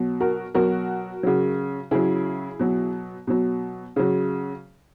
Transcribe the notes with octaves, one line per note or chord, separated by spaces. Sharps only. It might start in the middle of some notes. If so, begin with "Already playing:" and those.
Already playing: B2 F#3
F#4 A#4
B2 F#3 F#4 A#4
C#3 F#3
C#3 F#3 E4 G#4
B2 F#3
B2 F#3
C#3 F#3